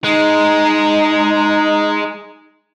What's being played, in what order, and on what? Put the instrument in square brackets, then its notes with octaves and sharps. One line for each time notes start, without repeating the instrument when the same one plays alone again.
[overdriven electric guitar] G#3 [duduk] D#4